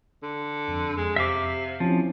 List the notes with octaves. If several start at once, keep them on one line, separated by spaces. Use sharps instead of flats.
D3
F2
G#3
C3 E5 F5 D6
F3 C4 C#4 E4